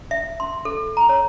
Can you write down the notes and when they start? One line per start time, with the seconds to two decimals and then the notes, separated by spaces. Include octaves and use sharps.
0.11 E5
0.40 C6
0.65 A4
0.97 A#5
1.09 C#5